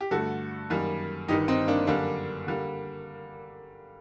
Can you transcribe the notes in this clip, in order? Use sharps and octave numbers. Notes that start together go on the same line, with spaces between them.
G4
G2 D3 A3 F#4 A4
F#2 D#3 G3 A#3
G1 G2 D#3 D#4 G4
C4 D#4
A#3 D4
F#2 D3 G3 A#3 D4
D3 G3 A#3